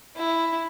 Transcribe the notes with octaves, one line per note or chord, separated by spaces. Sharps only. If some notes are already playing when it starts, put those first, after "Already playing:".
E4